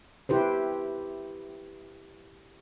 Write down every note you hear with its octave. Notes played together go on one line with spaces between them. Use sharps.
E4 G4 B4 C5